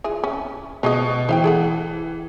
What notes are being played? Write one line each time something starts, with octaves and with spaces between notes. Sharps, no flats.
E3 F4 G#4
C#4
B2 F3 G#4 D#5
E3 C5 F5 G5
G#4 A4 F#5